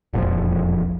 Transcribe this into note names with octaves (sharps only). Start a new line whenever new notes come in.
E1 A#1 F2 F3